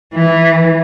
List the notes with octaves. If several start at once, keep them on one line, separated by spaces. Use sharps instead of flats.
E3